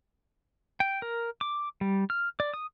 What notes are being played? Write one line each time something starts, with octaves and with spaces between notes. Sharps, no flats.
G5
A#4
D6
G3
F6
D5
D#6